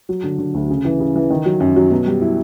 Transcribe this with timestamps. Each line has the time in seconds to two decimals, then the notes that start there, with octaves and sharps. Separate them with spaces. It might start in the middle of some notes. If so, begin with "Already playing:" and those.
0.09 F#3
0.24 D3
0.38 D3
0.54 D2
0.70 C#3
0.85 E3
1.00 C#3
1.16 E3
1.30 D#3
1.46 F#3
1.60 F#2
1.76 F#3
1.91 B2
2.06 G3
2.21 E4